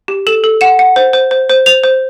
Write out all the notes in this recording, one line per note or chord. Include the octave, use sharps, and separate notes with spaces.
G4
A4 E7
A4
F#5 E7
F#5
C5
C5
C5
C5
C5 F7
C5